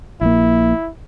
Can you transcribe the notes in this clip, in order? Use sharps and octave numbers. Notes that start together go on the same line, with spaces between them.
A#1 A#3 E4